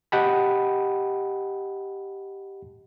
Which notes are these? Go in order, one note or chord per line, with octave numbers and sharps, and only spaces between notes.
G4 D#5 F#5 G5 A5 B5